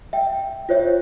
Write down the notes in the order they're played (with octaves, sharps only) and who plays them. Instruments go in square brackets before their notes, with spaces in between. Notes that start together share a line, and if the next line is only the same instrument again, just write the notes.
[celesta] E5 G5
F4 C5 C#5 E5